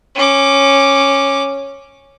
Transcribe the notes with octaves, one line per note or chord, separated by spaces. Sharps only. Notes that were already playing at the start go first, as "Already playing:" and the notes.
C#4 D6